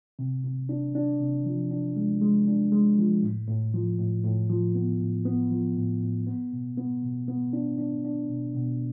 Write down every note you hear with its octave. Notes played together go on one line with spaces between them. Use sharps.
C3
C3
D4
D4
C3
F3
D4
G#3
G#3
D4
G#3
F3
A2
A2
F3
A2
A2
F3
B3
A2
B3
F3
A2
A2
B3
B2
B3
B2
B3
D4
D4
D4
B2
B2